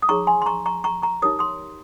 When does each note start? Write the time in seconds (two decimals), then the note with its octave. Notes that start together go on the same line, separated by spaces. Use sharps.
0.02 D#6
0.09 D#4 G#4 C#5 A#5 C#6
0.27 G#5 C6
0.42 C6
0.46 A#5 C#6
0.66 A#5 C#6
0.84 A#5 C#6
1.02 A#5 C#6
1.22 D#4 G4 A#4 C#5 D#6
1.39 C6 D#6